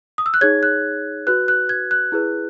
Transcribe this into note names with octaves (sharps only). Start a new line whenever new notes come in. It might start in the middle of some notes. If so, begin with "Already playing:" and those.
D#6
E6
F#6
D#4 G#4 C#5 G#6
F#6
F#4 B4 F#6
F#6
G#6
F#6
E4 G#4 B4